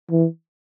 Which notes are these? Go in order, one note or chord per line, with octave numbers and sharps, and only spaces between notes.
E3